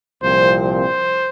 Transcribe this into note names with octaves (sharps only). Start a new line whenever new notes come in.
C2 A#2 F3 C4 C5
C5